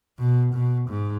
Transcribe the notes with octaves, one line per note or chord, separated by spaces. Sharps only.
B2
B2
G#2